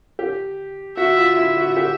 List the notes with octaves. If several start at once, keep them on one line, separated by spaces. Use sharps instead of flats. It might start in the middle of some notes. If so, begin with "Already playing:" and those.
G4
F#4 E5
F4
E4 E5
F#4
F#4
G4